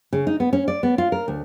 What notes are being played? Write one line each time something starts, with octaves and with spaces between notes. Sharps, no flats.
C#3
D#4
B3
C#4
D5
B3
F4
A#4
D2